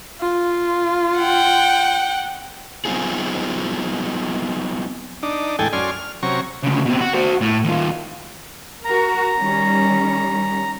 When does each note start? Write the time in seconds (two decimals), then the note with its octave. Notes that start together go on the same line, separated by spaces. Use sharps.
0.21 F4
1.18 F#5 G5
2.85 F#3 B3 C4 D#4 F4 G#4
5.23 D4 D#4
5.59 E2 A2 G#3 A4 G5 G#5
5.73 F#2 C#4 D5 G#5 C6 F6
5.91 F6
6.23 C3 F#3 C#4 A#5 C#6
6.64 D2 C#3
6.86 B2 C4
7.01 F#4
7.14 F#4 C5
7.41 A2
7.64 D#2 F4
8.85 F#4 A#4 A#5
9.37 D#3 G3 C#4